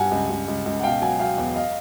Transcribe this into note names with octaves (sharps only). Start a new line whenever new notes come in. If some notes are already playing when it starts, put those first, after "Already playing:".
Already playing: G2 F#5 G#5
C#2
C#2
C#2
C#2
F#5
B2 F5 G5
F#3 F#5 G#5
F#3 F5 G5
E2
D#5 F5